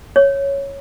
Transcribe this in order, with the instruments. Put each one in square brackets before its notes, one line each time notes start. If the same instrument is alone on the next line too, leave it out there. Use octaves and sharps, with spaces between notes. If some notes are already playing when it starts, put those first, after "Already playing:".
[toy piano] C#5